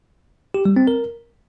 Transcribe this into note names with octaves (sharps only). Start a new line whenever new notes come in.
G4
G3
C4
A#4